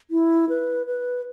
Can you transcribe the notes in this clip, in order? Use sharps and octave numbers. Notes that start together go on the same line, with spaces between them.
E4
B4
B4